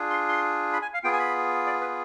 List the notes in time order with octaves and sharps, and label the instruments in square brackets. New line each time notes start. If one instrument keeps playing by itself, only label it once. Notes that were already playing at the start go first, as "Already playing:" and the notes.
Already playing: [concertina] D4 F4 G#4
C6
C6
B5
G#5
F5
B3 F4 G#4 G5
G#5
B5
D5
B4